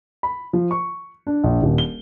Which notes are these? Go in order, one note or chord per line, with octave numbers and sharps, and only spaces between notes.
B5
F3
C#6
D4
A#1
D#1
G7